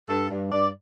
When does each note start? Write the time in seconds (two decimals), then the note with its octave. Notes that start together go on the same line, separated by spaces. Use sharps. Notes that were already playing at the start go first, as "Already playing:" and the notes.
0.09 G2 A4
0.30 G2
0.51 G2 D5